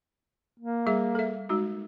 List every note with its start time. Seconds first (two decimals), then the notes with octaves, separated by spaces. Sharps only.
0.60 A#3
0.86 G3 G#4 E5
1.15 A4 E5
1.49 G#3 D#4 F#4